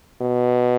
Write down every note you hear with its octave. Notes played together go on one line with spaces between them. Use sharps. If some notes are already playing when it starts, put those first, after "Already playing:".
B2